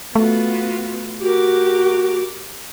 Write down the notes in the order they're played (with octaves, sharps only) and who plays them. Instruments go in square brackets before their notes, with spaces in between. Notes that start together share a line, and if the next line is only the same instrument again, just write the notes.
[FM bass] A3 [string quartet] B3 F4 F#4
[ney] F#4 [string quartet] G4 A#4 D6